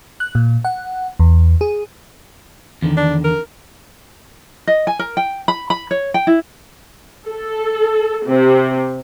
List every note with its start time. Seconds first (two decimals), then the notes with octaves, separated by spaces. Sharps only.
0.20 F#6
0.35 A#2
0.65 F#5
1.19 E2
1.61 G#4
2.82 E2 D3 D#3
2.97 D4
3.24 A#4
4.67 D#5
4.87 G#5
4.99 A#4
5.17 G5
5.48 B5
5.70 B5
5.91 C#5
6.14 G5
6.27 E4
7.27 A4
8.25 C3